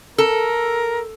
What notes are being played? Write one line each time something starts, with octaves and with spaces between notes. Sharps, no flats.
A4 A#4